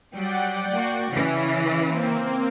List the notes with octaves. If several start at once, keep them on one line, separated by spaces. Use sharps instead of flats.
F#3 G3 D5 F#5 G5
A#3 F#4
C#3 E3 C#4
A#3 C4